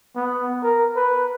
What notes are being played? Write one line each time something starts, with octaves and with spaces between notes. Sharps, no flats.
B3
A#4
B4